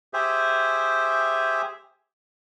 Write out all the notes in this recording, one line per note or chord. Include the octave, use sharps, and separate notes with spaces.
G4 G#4 C5 E5